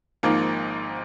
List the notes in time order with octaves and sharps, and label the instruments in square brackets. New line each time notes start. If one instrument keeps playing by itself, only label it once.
[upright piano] G#1 G#2 F3 A#3